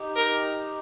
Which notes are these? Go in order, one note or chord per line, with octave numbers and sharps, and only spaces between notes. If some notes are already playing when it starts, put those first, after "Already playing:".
Already playing: D#4 G4
A#4